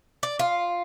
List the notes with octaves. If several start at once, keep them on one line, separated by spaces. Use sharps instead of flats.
D5
F4